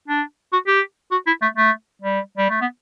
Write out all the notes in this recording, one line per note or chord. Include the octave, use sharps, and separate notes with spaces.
D4
F#4
G4
F#4
E4
A3
A3
G3
G3
A3
B3